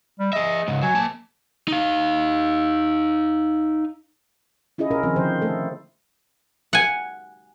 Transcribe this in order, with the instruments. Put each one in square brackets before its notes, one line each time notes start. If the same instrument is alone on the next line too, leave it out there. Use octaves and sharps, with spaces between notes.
[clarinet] G3
[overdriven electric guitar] G#4 E5 [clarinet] D#5
[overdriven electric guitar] C#2 G#2
[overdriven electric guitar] F#3 [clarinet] G#5
[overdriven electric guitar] A#3 A5
D#4 F5
[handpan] C#4 E4 F4 G#4 D#5
C3 C#4 G#4 A#4
D#3 F3 C4 G#4
D3 F3 C5
A3 A4
[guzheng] F#5 G#5